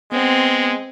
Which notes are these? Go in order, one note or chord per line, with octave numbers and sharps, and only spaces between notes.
G#3 B3 C4